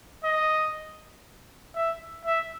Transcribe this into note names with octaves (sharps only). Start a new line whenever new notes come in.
D#5
E5
E5